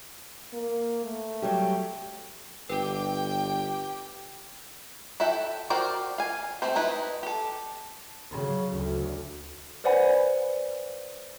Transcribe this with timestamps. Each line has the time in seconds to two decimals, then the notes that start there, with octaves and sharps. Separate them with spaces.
0.53 A#3
1.05 A3
1.42 F#3 G3 G4
2.70 G1 G4 B4 G5
5.20 E4 A4 E5 F#5 G5
5.70 F#4 A#4 C5 D5 G5
6.18 F5 G#5
6.62 A3 C4 C5
6.75 D#4 E4 B4
7.23 G4 A4
8.31 C#3 F#3
8.76 D2
9.84 B4 C5 D5 F#5 G#5 B5